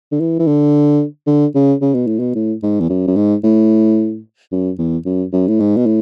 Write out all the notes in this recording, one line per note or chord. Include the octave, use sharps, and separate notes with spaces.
D3
E3
E3
D3
D3
C#3
C#3
B2
A2
B2
A2
G#2
E2
F#2
F#2
G#2
A2
F#2
E2
F#2
F#2
A2
G#2
B2
A2